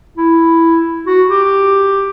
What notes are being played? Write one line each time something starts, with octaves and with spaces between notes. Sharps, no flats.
E4
F#4
G4